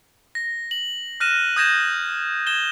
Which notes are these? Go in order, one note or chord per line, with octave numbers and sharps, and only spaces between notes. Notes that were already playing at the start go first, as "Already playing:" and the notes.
A#6
F#7
F6 F#6 A#6 D#7 E7
D#6 G6 G#6 A#6 E7
G#6 E7 G7